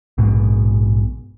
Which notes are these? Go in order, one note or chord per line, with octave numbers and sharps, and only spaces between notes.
A#1 G#2 B2